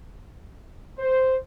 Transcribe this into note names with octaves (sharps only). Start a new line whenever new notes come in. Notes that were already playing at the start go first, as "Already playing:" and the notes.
C5